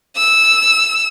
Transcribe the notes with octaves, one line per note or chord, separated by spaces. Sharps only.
E6